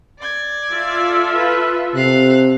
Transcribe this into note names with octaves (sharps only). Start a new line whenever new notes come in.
D5 G#6
F4 A4 E5
B4
C3 A4 F5 F#6